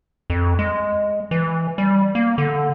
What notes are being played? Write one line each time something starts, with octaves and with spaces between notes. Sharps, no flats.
F2
G#3
E3
G3
A#3
D3